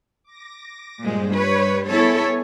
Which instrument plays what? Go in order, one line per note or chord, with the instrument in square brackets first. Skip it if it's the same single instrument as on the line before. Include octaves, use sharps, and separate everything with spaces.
[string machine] D6 A#6
[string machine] G2 G3 C5 [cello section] A#2 G#3
[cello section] B4 C#5
[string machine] B3 G#4 G#5 [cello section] E4 A4 C#5